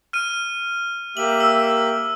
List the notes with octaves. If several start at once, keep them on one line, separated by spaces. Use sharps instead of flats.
F6 D#7
A#3 G4 E5 F#7
E6